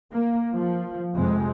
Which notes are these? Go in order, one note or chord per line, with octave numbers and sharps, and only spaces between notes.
A#3
F3
F2 C3 G#3